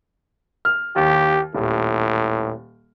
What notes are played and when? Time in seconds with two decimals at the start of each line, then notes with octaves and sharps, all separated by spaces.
0.65 F6
0.96 D#2 G4
1.55 D#1 A2